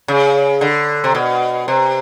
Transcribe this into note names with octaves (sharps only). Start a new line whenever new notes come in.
C#3
D3
C3
B2
C3